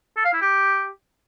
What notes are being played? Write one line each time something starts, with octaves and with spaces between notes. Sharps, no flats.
A4
F5
E4
G4